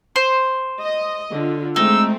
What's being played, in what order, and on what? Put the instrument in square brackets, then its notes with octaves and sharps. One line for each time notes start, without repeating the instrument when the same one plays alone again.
[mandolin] C5
[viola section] D#5
D3 F4
[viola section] G#3 A3 C4 [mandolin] D#4 [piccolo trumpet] E6